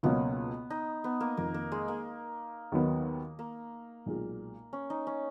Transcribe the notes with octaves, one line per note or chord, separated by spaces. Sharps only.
C#2 B2 F#3 A#3 B3 C#4
D#4
B3
A#3
F1 F2 D#3 A#3
A#3
G#3
A#3
D#2 D#3 F#3 B3
A#3
B1 A#2 G#3
C#4
D#4
C#4